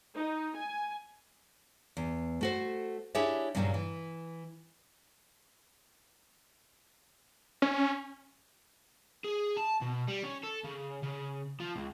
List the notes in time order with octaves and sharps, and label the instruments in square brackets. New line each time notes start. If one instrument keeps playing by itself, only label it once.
[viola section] D#4
G#5
[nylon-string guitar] E2
A3 F#4 C5
D4 E4 G4 G#4 C#5 E5
G2 A#2 C#3 E3 F#3 G3
E3
[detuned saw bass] C#4
[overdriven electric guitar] G#4
A5
B2
G3
C#4
A4
C#3
C#3
F3
C#2